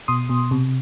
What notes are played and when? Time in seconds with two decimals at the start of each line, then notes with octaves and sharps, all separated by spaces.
0.08 B2 C6 D#6
0.29 B2
0.51 C3